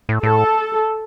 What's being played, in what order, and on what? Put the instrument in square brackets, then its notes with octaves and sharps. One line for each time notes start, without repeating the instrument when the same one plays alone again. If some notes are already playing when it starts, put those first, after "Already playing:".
[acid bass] A2
[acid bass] A2 [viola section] A4